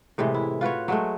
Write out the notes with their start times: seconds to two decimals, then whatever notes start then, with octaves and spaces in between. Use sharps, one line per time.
0.18 A2 C3 E3 G#3
0.34 E4
0.61 F4 F#4 B4 C#5
0.88 F#3 G#3 A3